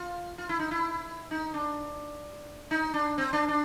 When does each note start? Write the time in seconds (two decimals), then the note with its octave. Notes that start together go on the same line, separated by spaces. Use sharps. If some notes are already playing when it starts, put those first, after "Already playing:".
Already playing: F4
0.38 F4
0.49 E4
0.59 D#4
0.71 E4
1.31 D#4
1.54 D4
2.71 D#4
2.94 D4
3.18 C4
3.33 D4
3.48 D4